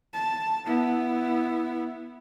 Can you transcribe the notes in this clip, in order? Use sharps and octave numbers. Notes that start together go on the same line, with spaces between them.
A5
B3 E4